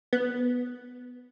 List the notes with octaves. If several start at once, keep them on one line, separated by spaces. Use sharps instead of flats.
B3